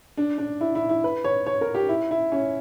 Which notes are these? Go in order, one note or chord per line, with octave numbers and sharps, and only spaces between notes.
D4
D4
E4
E4
E4
B4
C#5
C#5
A#4
G4
E4
E4
C#4